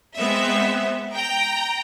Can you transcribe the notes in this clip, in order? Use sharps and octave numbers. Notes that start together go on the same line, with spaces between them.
G#3 B3 C4 E5
G5 A#5